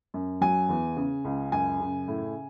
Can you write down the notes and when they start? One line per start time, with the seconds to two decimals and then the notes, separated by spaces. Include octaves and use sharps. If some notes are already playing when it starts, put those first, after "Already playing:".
0.14 F#2
0.41 F#3 G#5
0.69 E2
0.97 C#3
1.25 C#2
1.52 F#2 G#5
1.80 C#3
2.08 A2